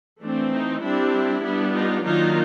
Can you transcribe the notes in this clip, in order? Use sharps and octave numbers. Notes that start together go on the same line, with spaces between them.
E3 A3 C4 D4
D#4
G3 C4 D4 E4
G3 B3 D4
D#4 F4
D#3 F#3 A#3 D4 D#4 F4